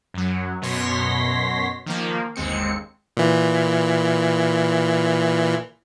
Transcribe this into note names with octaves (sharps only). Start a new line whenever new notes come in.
F#2 F#3
F#2 B2 C#5 C6 A#6 B6
D#3 F3 A#3
G1 D#2 G#3 C4 C#7
A#2 E3